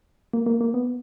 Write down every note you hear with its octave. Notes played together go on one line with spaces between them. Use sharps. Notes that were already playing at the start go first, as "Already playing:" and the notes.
A#3
A#3
A#3
B3